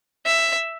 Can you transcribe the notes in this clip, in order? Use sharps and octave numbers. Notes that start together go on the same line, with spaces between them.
E5